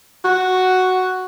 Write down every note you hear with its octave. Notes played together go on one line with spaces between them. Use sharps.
F#4